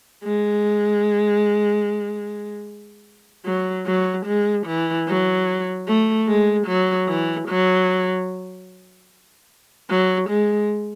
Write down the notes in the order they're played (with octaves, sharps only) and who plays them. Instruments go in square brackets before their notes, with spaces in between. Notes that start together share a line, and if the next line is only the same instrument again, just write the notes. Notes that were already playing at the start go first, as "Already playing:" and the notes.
[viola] G#3
F#3
F#3
G#3
E3
F#3
A3
G#3
F#3
E3
F#3
F#3
G#3